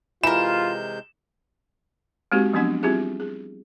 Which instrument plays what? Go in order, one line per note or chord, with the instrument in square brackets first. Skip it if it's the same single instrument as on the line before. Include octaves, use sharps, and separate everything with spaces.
[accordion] C3 G#3 G6 [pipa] E3 A#4 [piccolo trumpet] F4 [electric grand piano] E7
[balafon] G#3 A#3 C4 D#4 F#4 G4
F3 F#3 B3 C4 D4 F#5
G3 C4 E4 F4 G4 G#4
G#4